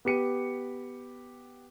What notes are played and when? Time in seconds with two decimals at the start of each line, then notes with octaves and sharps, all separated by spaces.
0.05 B3 G4 C#7 D#7